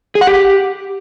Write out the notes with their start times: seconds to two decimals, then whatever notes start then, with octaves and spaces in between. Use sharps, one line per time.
0.15 G#4
0.21 F#5
0.27 G4